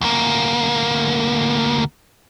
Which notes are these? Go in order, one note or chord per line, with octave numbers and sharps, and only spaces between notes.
D2 A#3